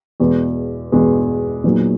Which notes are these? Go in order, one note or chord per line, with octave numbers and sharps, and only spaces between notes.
E2 B2 G#3 B3
E2 B2 G#3 B3
A#2 F#3 B3 D#4 G#4